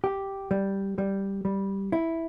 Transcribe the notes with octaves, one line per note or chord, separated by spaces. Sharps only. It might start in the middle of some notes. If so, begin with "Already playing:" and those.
G4
G3
G3
G3
E4